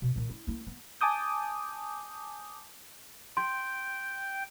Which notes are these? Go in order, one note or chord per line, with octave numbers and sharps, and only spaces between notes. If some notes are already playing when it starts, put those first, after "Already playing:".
B2
A#2 D#3
E4
A#3 E4
B3
G#5 A5 D6 D#6 G6
G5 C6